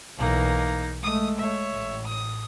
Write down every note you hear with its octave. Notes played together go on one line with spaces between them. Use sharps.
B1 E3 A#3 D#4
G#3 A3 D#6
C#5 E5
A1 A2
D#6